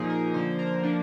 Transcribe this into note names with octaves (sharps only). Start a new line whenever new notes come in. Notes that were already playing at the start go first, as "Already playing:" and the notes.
Already playing: A#2 F3 A#3 D#4 G#4
A#4
D3 F3 A#3 C5
A#4
F3 A#3 D4